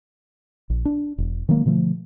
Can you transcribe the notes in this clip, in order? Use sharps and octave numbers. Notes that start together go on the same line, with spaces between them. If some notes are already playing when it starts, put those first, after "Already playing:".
A#1
D4
E1
D#3 F#3 G#3 A#3
B2 D3 F3 A3